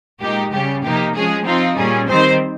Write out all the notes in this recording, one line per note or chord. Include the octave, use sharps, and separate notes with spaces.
A#2 G#3 D#4 G4
C#3 G3 C#4 G4
C3 F3 A#3 D#4 G4
F3 G#3 C#4 G#4
F3 C4 D#4 F4
A#2 G3 C#4 G#4
D#3 G3 C4 D#4 C5